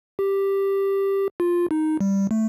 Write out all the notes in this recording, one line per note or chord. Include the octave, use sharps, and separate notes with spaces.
G4
F4
D#4
G3
A3